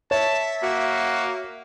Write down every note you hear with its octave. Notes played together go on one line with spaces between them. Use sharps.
C#5 E5 A5
A#3 F#4